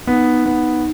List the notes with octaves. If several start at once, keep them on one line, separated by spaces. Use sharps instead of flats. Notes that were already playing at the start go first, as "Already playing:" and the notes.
B3 D#4
B3